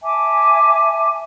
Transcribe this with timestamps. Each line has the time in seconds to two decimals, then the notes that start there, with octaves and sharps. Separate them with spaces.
0.02 E5 G#5 A5 D6